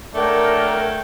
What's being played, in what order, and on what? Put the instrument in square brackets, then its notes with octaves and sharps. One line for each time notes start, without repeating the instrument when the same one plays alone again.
[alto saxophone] A3 [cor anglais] D4 [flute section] A#4 [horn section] C#5 F#5 G5